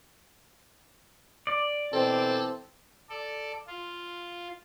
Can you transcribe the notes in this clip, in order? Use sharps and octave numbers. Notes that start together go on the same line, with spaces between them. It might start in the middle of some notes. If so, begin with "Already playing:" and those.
D5
B2 E3 C4 A4
A4 D5
F4